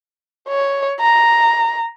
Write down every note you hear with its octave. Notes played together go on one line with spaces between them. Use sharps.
C#5
A#5